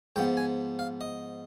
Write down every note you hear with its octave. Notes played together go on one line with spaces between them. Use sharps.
G#2 F3 B3 G5
G#5
F5
D#5